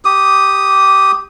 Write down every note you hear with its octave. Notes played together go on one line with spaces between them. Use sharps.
G4 D#6